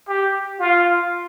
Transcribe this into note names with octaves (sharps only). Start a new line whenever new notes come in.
G4
F4